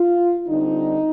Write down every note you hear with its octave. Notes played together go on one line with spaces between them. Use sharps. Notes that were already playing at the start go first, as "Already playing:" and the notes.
Already playing: F4
D3 G3 C4 D#4